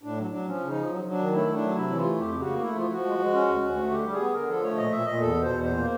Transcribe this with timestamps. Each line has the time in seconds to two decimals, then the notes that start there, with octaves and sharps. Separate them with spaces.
0.03 A2 D4
0.17 F#3
0.31 F#3 D4
0.46 F3 C#4
0.60 C#3
0.68 D#4
0.75 F3
0.89 F#3
1.04 F#3
1.11 D4
1.18 D#3
1.32 A3 E4
1.47 A3
1.54 D4
1.61 F#3
1.75 C3 E4
1.89 E3
1.97 F4
2.04 A3
2.18 F2 G4
2.33 C#3
2.40 F#4
2.47 A#3
2.61 A3 E4
2.76 F3 F4
2.90 F3 F#4
3.05 G#3
3.19 G#3
3.33 C#4
3.48 D2
3.62 D2
3.76 A3
3.91 D3 G4
4.05 G3
4.12 G#4
4.19 B3
4.34 D3 A#4
4.48 F3 A4
4.62 A3 C#5
4.77 A#2 D#5
4.91 A#2 E5
5.06 A#2 D#5
5.20 E2 A4
5.35 B2
5.42 C5
5.49 E2
5.63 A#2 C5
5.78 A#3